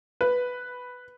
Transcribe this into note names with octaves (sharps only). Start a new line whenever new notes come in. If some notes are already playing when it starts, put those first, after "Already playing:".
B4